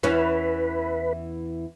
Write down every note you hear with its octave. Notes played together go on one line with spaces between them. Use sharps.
E2 E3 C#4 B4